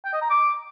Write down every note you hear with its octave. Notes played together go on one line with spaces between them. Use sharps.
G5
D#5
A#5
D6